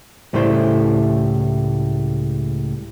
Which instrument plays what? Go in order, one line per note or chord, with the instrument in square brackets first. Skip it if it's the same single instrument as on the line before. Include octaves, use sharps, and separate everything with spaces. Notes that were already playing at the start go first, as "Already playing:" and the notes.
[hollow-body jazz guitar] C#2 A2 G3 A3 E4 C5